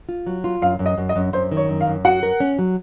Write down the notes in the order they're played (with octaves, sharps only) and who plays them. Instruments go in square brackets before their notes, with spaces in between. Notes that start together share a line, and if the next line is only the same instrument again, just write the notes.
[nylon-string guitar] F4
F#3
F4
[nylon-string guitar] F#2 [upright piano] F5
[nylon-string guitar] F#2
[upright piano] D#5
[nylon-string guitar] F#2
[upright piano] D#5
[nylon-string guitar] F#2
[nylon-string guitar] F#2 [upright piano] C5
[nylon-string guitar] D#3
[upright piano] C#5
[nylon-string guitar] F#2
[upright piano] F5
[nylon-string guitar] F#2
[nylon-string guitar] F#4 [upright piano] F#5
[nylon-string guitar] A#4
C#4
F#3